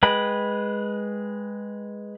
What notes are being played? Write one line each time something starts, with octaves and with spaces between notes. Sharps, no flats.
G#3 B4 G5 B5